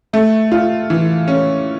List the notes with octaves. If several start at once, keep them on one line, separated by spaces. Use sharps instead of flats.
A3 E5
F4
E3
C#4